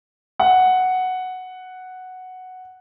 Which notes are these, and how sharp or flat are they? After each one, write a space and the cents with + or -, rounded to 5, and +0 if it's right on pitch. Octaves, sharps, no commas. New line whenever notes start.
F#5 +0